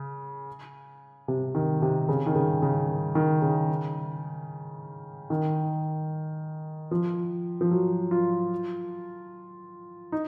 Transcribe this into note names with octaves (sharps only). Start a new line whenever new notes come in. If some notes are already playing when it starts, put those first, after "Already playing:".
Already playing: C#3
C3
D#3
C3
C#3
D#3
C#3
C#3
D#3
C#3
D#3
F3
F3
F#3
F4
D#4